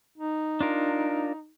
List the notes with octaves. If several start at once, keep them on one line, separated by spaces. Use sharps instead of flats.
D#4
D4 F4 A#4